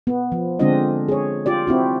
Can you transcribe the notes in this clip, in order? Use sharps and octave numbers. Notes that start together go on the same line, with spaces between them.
B3
F3
D3 G#3 C4 D4 F4 D#5
G#4 C#5
F4 G4 D5
C4 E4 F#4